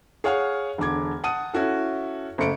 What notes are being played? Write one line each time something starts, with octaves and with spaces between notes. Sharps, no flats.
G#4 C#5 F5 F#5 C#6 F6
E1 D3 D6 G#6
F#5 A5 D#6 D#7
C#4 E4 F#4 A4
F#1 A3 C#7 D7